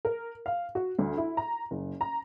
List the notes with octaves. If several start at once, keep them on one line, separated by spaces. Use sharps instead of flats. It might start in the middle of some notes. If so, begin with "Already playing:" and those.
A#4
F5
F#4
D2
E4
A#5
F#1
A#5